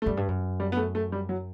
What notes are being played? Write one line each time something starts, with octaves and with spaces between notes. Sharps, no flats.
A3
F#2 G3
G2
F#2
G3
B3
A3
A3
G3
F#3